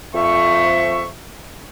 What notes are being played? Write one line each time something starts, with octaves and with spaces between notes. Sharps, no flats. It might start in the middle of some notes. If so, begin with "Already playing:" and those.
F2 E5 C#6